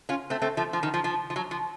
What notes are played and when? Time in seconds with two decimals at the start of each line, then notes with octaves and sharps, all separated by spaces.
0.09 C#4 F4
0.30 A3 C4
0.42 A3 C4
0.57 F3 A3
0.73 F3
0.83 D#3
0.94 F3
1.04 F3
1.30 F3
1.36 F#3
1.51 F3